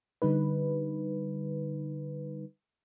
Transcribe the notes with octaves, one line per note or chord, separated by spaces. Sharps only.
D3 G3 D#4 B4